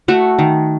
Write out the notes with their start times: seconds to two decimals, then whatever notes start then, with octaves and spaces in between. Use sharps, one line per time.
0.08 A3 F#4
0.39 D#3